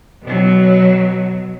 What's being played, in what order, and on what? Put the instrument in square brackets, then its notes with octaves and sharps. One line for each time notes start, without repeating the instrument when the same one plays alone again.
[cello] B2 F#3